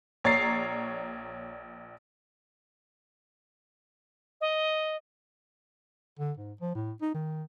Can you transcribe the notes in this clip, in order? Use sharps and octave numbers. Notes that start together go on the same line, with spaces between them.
A#1 C#5 D5 A#5 A6 C7
D#5
D3
G#2
F3
A2
D#4
D#3